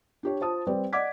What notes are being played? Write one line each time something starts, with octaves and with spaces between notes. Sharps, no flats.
D4 G4 C#5
F4 C5 A5 D#6
G3 C4 G4 B4 D5
D5 D#5 F#5 D6 G#6 B6